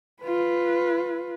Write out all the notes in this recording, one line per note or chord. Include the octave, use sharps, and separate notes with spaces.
F4 B4